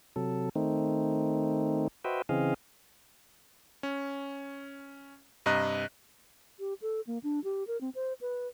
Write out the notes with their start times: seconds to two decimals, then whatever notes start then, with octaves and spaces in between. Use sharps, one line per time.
0.16 C3 F#3 A4
0.55 D#3 A3 C4 D#4
2.04 F#4 B4 C5 D#5 E5 G5
2.29 C#3 E3 C4 G#4 D#5 F5
3.83 C#4
5.46 G2 C3 D#5 A#5 F#6
6.59 G4
6.82 A4
7.07 A#3
7.23 D4
7.44 G4
7.67 A#4
7.81 C4
7.95 C5
8.21 B4